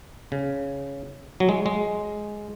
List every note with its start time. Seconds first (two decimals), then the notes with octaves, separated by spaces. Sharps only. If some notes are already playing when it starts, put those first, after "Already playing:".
0.32 C#3
1.40 F#3
1.49 G#3
1.66 G#3